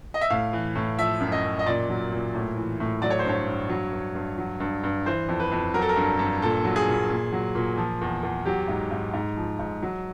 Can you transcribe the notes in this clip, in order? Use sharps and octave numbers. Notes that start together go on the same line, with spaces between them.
D#5
E5
A2 F5
E3
A2
F3 E5
F#2
D#5
F#2
D#5
A#2 D5
F#3
A#2
A2
E3
A2
F#3 D5
C#5
C5
G2 C#5
G2
F#3
G2
G2
F#3
G2
G2
E3 C5
F2
B4
F2
F#3 A#4
A4
A#4
G2
G2
A#2 A4
F#3
G#4
A#2
A#2
F#3
A#2
F3
E2
E2
F#3 G4
G#2
G#2
G#2
F3
G#2
F#3